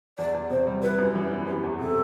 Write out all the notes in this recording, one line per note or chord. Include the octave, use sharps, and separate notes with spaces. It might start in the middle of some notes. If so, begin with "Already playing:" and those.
E2 D5
E2
C3 C5
G3
E4 B4
F#2
E3
B3
B3 G4
E2
C3 A4